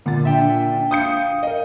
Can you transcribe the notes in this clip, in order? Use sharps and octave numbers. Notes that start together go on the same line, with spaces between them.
A#2 D3 F#5 A6
D4 E5 G5
F5 D#6 G6 C#7
A#4 D#5